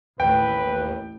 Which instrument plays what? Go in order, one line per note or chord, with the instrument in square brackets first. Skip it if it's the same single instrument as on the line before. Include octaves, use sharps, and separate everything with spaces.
[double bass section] A1 A2 [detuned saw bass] D#2 [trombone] B4 [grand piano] G5